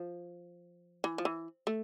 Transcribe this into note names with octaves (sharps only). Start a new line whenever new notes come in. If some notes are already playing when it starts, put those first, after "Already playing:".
Already playing: F3
E3
F3
E3
A3